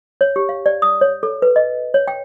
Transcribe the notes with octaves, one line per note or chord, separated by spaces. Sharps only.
C#5
G4
F5
D5
D#6
C#5
A4
B4
D#5
C#5
G5